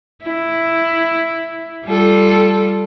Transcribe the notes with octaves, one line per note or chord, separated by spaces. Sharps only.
E4
G3 F4 A4